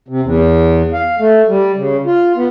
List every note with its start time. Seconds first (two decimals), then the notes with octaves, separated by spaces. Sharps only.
0.08 C3
0.23 E2
0.93 F5
1.19 A3
1.49 G3
1.76 C#3
2.06 F4
2.36 B3